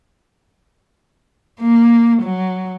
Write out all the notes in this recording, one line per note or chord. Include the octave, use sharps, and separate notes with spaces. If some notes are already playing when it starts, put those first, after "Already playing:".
A#3
F#3